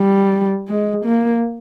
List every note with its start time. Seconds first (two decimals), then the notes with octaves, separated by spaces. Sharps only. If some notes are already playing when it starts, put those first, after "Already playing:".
Already playing: G3
0.68 G#3
1.05 A#3